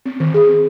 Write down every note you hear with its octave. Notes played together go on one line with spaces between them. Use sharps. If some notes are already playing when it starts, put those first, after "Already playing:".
C4
D#3
G#4
C4